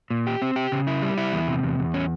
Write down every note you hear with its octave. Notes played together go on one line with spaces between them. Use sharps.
A#2
G4
C4
G4
C#3
E4
G3
E4
E2
C3
E2
E2
C#4